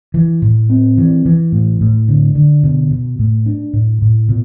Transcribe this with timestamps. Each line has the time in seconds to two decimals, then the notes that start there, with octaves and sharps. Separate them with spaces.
0.14 E3
0.42 A2
0.70 C4
0.98 E3
1.26 E3
1.52 A2
1.81 A2
2.08 D3
2.35 D3
2.63 B2
2.91 B2
3.19 A2
3.46 D4
3.73 A2
4.02 A2
4.29 B2